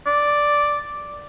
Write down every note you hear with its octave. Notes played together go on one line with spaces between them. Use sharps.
D5